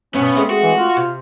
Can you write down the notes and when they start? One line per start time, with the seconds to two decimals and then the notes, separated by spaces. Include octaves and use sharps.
0.14 G2 B2 B3 C#4
0.36 G#3 A3 C4
0.50 F#4
0.63 E3
0.78 F4
0.97 C3